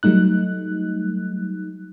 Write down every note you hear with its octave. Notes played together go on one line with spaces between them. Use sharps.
F#3 G3 A3 D#4 F#6